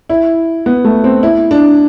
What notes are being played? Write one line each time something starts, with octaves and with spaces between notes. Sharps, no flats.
E4
B3
A3
C4
E4
D4